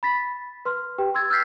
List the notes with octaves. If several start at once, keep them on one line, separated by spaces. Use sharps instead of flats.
B5 A6 B6
B4 C6 F6
G4 B4 G5
C6 E6 G#6 A6
E6 F6 G6 A6 B6 C7